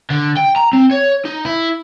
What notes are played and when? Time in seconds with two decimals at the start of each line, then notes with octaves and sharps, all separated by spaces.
0.10 D3
0.37 G5
0.56 A#5
0.73 C4
0.91 C#5
1.25 D#4
1.45 E4